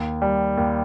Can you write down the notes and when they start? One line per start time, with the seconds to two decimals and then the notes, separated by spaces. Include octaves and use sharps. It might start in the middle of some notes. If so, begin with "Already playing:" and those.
Already playing: D#2
0.22 G3
0.57 D#2